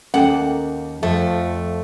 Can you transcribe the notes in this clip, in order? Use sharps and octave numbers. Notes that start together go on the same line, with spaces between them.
D#2 A#3 C#4 A4 F#5 G5
F2 F3 A3